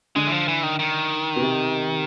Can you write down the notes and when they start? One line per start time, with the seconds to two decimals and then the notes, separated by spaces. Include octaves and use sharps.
0.16 D3 G#3
0.27 E3
0.32 F3
0.48 E3
0.63 D#3
0.79 D#3
1.36 B2
1.41 C3